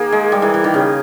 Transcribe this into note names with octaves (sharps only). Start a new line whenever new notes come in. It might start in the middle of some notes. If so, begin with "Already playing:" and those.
Already playing: D#3 A#3 G#4
G#3
G3
E3
E3
D#3
C#3 G#4